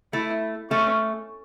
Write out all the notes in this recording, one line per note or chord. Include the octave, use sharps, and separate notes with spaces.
A3 E4
A3 C#4